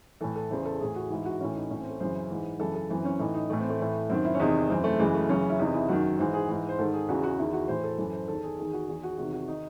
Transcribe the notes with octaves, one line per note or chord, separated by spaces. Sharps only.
A2 E3 A4
A4
E2 C#3 E3 C5
A4
A2 E3 G#4
F#4
G#2 E3 E4
F#4
A2 E3 C#4
D#4
A2 E3 C#4
C4
A4
F#2 C#3 E3 C5
G#2 E3
F#2 C#3 E3 A4
A4
F#2 E3 C4
C#4
A2 E3 D#4
D#4
A2 E3 A3
C4
A3
A2 E3
F#2 D#3 C4
E4
C#4
E2 C3 D#3 D#4
F#2 E3 C4
A3
F#2 C#3 E3 G#3
A3
F#2 C#3 E3 C#4
E4
E2 C3 E3 D#4
E4
F#2 D#3 F#4
G#2 E3 C5
G#4
G#2 E3
C5
G#2 D#3 A4
G#4
E2 C#3 E3 F#4
F#4
E2 D#3 E4
F#4
A2 E3 C5
A4
F#2 E3 A4
C5
E2 D#3 A4
G#4
E2 D#3 G#4
F#4
E2 D#3 G#4
F#4
E2 C3 D#3 F#4
F#4
D#3 D#4